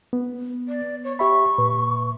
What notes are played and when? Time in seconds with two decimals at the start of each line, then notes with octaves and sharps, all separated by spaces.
0.13 B3
0.69 D5
1.04 C#5
1.19 G4 E5 B5 C#6
1.58 A#2 B4